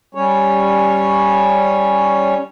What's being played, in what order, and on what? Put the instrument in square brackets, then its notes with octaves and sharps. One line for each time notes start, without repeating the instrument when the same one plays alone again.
[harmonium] G3 C#4 C#5